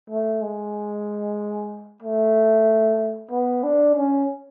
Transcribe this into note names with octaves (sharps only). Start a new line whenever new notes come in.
A3
G#3
A3
B3
D4
C#4